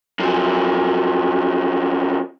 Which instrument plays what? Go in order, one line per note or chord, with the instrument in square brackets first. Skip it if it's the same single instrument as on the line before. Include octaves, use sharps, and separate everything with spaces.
[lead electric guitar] F#2 F3